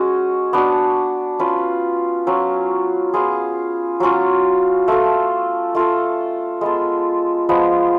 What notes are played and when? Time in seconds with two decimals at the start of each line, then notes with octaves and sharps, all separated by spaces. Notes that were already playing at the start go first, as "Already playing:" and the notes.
Already playing: G#3 C#4 F#4
0.53 B3 D4 F#4
1.39 C#4 F4 B4
2.27 F#3 C#4 F4
3.14 B3 F4 G#4
4.00 F#3 C#4 F4
4.88 A3 F4 A4
5.75 A3 F4 A4
6.61 G#3 B3 F4 A4
7.49 F3 G#3 B3